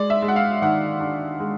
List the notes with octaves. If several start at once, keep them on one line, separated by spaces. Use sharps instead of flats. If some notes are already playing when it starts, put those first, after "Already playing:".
Already playing: G#3 D5
E5
G#3
F#5
F5
D#3 F#5
D4
G#3